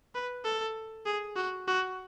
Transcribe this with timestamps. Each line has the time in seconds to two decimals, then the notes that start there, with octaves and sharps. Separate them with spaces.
0.15 B4
0.45 A4
1.06 G#4
1.36 F#4
1.67 F#4